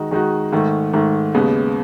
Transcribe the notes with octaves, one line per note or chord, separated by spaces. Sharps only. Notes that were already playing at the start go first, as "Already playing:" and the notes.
Already playing: D#3 G#3 D#4 F#4
D#3 G#3 D#4 F#4
G#2 D#3 A3
G#2 D#3 A3
D#2 C#3 G#3 B3